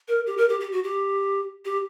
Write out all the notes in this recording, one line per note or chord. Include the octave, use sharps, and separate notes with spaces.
A#4
G4
A#4
G4
G4
F#4
G4
G4